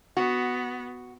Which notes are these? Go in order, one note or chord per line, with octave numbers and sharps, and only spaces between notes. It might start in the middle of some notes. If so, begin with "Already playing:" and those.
B3 F#4